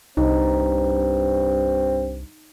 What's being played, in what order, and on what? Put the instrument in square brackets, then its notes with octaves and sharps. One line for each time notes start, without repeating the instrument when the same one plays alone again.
[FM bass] C2 [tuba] G2 [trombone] C4 [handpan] D#4